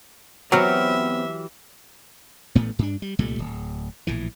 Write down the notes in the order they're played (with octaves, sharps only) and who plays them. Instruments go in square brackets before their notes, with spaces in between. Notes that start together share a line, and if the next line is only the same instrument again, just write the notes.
[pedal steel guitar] E3 G4 F6 [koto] F#3 [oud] B3 C4 F#4 [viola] E5
[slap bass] A1 A2 A3 B3
G2 D4
G3
C2 A#2 G3 A3
D1
A#1 A2 E3